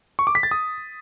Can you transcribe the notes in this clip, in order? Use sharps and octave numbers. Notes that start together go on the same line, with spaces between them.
C#6
D6
B6
A6
D#6